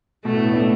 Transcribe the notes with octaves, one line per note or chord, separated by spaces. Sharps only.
B2 A3
A2
B3
D4